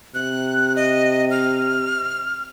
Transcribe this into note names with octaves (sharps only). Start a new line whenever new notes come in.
C3 F#6
D#5
F6